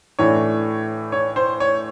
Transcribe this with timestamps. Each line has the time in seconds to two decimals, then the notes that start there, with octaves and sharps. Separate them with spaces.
0.19 A2 E3 A3 D4 C#5
1.12 C#5
1.36 C5
1.60 C#5